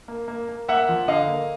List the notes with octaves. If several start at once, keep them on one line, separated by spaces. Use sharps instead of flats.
A#3
A#3
A#3
A#3 E5 F#5
F3
D3 D#5 F5
A#3